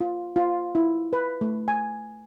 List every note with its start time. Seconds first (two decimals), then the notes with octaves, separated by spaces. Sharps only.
0.01 F4
0.36 F4
0.75 E4
1.13 B4
1.41 A3
1.68 G#5